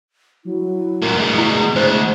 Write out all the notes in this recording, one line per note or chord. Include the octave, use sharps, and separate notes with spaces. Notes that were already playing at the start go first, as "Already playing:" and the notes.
F#3 E4
F#2 A#2 A#4
D2 B2 G#3 G#4
E4
D2 C5